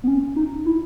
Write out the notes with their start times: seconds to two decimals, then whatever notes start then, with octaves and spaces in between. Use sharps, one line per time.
0.04 B3
0.08 C#4
0.36 D#4
0.66 E4